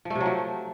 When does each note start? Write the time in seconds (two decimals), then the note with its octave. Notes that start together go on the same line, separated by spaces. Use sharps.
0.05 F3
0.10 A3
0.15 C3
0.21 F#3
0.26 F3